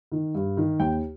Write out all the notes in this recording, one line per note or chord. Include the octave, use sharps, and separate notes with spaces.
D#3
G2
D#3
D#2 G5